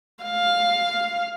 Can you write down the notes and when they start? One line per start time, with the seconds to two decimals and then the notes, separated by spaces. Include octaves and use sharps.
0.23 F5